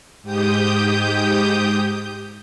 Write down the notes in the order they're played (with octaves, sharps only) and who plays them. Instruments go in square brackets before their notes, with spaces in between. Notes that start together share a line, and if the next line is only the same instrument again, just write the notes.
[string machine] G#2 G4 D#6 G6